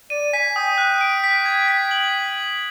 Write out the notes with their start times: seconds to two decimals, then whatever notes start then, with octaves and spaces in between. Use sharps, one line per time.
0.10 D5 D#7
0.33 G#5 B6
0.56 G5 D#6
0.78 F#6
1.01 D7
1.24 B6
1.46 G#6
1.68 B6
1.91 F#7